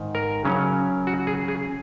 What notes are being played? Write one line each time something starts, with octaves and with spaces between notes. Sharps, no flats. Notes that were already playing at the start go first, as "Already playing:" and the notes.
Already playing: G#2 D#3
A#4
C#3 F#3 C#4
F#4
G#4
G#4